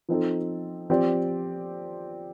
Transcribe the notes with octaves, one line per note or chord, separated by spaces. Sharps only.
F3 C4 D#4 A4
F3 C4 G4 D5